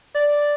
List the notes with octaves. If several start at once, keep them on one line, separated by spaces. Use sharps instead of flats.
D5